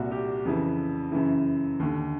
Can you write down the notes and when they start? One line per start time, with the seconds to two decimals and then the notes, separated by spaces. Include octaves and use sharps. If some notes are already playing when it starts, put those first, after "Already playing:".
Already playing: C2 A#2 F#4
0.11 G4
0.45 F2 C#3 E3
1.12 F#2 C#3 E3
1.79 D#2 D3